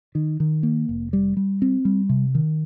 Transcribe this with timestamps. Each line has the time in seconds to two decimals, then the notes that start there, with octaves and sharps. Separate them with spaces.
0.15 D#3
0.40 D#3
0.63 A#3
0.89 F1
1.13 G3
1.37 G3
1.62 C4
1.85 G3
2.09 C3
2.35 D#3